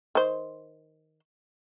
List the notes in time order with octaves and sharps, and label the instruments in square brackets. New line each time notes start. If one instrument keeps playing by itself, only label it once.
[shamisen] D#3 C5